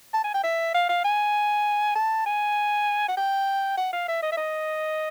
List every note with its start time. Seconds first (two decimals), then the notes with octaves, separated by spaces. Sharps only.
0.13 A5
0.24 G#5
0.34 G5
0.43 E5
0.74 F5
0.89 F5
1.04 G#5
1.95 A5
2.26 G#5
3.08 F#5
3.17 G5
3.77 F#5
3.93 F5
4.08 E5
4.22 D#5
4.32 E5
4.37 D#5